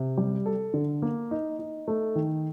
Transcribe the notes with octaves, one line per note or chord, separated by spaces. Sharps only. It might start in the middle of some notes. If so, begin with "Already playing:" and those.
Already playing: C3
G3
A4
D3
A#3
D#4
D#4
A3
D#3